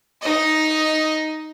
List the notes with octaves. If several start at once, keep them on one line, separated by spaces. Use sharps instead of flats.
D#4 D#5